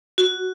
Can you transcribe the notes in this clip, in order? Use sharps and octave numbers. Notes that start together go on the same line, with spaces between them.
F#4